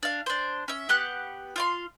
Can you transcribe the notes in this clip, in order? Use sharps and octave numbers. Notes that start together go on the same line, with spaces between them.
D4 F5
D4 C5
C#4 E5
B3 G4 F#5 F#6
F4 F5 C6